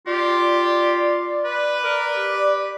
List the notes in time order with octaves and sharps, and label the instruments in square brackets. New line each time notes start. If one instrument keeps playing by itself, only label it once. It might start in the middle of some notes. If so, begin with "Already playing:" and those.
[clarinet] F4 [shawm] G4 [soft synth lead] D5
[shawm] B4
[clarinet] A#4
G4